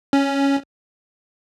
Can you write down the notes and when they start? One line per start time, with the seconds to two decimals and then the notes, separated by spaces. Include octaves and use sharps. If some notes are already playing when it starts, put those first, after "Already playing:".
0.13 C#4